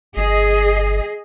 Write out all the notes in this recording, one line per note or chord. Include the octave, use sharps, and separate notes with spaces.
G1 G#4 D#5